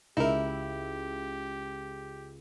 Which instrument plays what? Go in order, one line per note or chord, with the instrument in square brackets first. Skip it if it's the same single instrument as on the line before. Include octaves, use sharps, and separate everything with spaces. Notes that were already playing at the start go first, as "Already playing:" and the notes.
[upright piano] C#2 [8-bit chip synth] D#4 A#4 [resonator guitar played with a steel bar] E4 [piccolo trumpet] G4